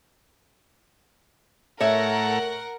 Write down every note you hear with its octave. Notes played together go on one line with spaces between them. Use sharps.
A2 A4 A#4 C#5 E5 F#5 A#5